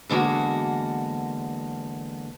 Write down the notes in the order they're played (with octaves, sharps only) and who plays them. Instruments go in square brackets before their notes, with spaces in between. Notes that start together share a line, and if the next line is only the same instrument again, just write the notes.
[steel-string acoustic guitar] E2 D3 G#3 A#3 F#4